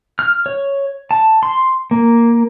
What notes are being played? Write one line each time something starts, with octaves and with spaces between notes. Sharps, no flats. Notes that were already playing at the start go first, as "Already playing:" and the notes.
F6
C#5
A5
C6
A#3